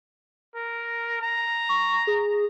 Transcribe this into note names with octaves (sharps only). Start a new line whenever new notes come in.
A#4
A#5
C#6
G#4